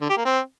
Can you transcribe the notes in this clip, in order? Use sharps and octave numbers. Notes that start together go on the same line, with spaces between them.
D3
G4
A#3
C4